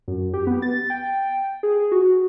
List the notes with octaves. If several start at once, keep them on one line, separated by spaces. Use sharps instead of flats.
F#2
G4
B3
A6
G5
G#4
F#4